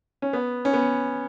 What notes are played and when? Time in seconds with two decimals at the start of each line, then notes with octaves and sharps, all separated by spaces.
0.22 C#4
0.33 B3
0.65 C#4
0.73 B3